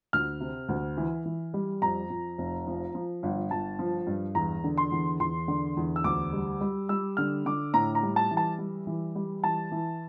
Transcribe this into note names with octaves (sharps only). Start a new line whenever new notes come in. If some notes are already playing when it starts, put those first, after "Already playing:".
D2 F6
C3
D2
E3
E3
G3
F2 A#5
F2
F1
F3
F3
G1
G1 A5
F3
G2
E2 A#5
D3
C6
E2
E2 C6
D3
E2
E6
D2 D6
G3
G3
G3 E6
D3 F6
D3 D6
A2 A#5
A#5
G3
A5
E3
A5
G3
E3
G3
E3 A5
E3